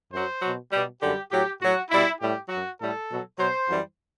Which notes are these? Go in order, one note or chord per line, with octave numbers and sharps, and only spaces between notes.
F#2 F#3 C5
B2 F#3
B2 G3
F#2 D3 G3 G4
A2 F#3 G4
A2 F#3 F#4
B2 G3 E4
A2 G3 G4
F#2 F#3 F#4
A2 G3 A4
B2 F#3
B2 F#3 C5
F#2 E3 G3